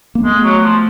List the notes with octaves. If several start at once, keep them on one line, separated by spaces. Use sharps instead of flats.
A#3
G#3 A3 B3
F#3
F3